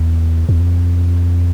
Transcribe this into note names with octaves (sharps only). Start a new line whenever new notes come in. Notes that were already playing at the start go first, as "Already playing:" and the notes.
Already playing: E2
E2
F2